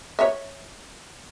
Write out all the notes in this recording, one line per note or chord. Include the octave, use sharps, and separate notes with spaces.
C#5 E5